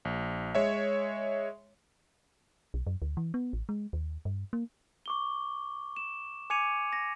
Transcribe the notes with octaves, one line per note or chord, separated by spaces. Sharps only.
A#1
G#3 C#5 E5
B1
F#2
D2
E3
B3
A1
G#3
D#2
G2
A#3
C#6 D6 G7
E7
G#5 D6 G#6 C#7 D#7 F7
A#6